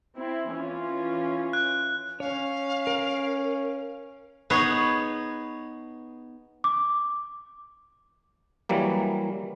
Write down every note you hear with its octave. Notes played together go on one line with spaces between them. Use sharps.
C4 E4
E3 C#4 F4
F#6
C#4 C#5 F5
A#4
B3 D#4 G#4 B4 C#5
D6
E3 F#3 G3 A#3